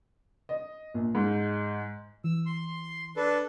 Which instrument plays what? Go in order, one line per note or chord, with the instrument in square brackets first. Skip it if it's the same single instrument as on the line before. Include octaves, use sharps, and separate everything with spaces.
[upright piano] D#5
A#1
G#2
[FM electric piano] E3 [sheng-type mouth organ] E6
[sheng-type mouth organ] C6
D4 A4 B4